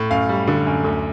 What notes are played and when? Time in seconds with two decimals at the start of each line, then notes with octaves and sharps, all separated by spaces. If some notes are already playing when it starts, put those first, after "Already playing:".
Already playing: A2
0.10 F#2 F5
0.29 G3
0.48 D3
0.67 F#2
0.84 D2